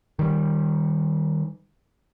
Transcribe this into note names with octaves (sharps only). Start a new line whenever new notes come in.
D#3 G3